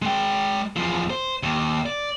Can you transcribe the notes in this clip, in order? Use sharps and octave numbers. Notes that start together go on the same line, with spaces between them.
G#3 G5
E2 F3
C5
D#2
D5